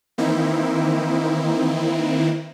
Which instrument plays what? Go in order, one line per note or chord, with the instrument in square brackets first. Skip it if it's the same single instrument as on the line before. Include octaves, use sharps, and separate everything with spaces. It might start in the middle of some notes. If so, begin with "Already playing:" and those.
[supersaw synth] D#3 E3 A#3 C4 D#4 E4